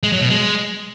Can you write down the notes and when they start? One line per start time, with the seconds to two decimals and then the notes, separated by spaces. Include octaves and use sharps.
0.03 G#3
0.12 F#3
0.21 B2
0.30 G#3